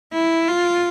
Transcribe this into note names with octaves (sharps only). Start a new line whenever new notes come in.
E4
F4